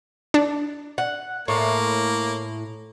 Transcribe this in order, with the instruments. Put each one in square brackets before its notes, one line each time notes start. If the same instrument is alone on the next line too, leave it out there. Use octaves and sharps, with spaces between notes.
[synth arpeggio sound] D4
[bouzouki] F#5
[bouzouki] A2 [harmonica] A#3